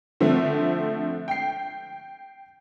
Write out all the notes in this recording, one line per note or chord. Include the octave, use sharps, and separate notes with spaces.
D3 F3 A3 C4
G5 C7